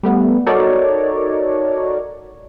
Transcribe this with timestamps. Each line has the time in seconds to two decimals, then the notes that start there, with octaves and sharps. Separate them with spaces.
0.03 G3 A3 B3
0.46 D#4 F#4 A4 A#4 C#5 D5